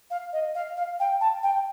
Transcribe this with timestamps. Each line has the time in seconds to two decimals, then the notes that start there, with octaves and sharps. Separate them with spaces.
0.10 F5
0.33 D#5
0.55 F5
0.77 F5
1.00 G5
1.21 A5
1.43 G5